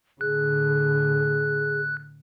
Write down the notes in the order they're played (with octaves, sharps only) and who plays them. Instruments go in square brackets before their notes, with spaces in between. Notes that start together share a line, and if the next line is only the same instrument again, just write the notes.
[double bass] A2 D3 [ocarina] G#4 [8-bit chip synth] F#6